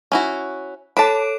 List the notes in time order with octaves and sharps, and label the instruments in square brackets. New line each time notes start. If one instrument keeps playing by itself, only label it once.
[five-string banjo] C#4 E4 F#4
[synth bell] A4 C#5 D7 [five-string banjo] A5 B5